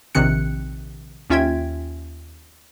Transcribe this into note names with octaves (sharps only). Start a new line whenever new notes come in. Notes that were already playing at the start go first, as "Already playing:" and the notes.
A#1 C3 D#3 C4 F#6 C#7
D#2 C#4 F4 E5 G5 G#6